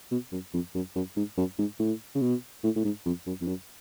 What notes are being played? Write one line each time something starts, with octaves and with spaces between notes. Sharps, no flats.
B2
F#2
F2
F#2
F#2
G#2
F#2
G#2
A2
C#3
B2
A2
A2
G#2
F2
F#2
F2
F#2